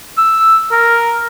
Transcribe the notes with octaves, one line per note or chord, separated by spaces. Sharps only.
E6
A#4